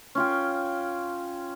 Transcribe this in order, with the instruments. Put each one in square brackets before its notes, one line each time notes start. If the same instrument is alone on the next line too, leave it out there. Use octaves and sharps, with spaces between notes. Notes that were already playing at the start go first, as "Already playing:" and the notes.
[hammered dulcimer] C#4 F4 G5